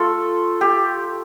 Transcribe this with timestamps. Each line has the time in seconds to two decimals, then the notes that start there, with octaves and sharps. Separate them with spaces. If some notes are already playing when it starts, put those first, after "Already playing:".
Already playing: A3 F4 A4
0.61 G4